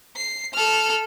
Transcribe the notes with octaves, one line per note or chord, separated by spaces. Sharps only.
C7
A4 F6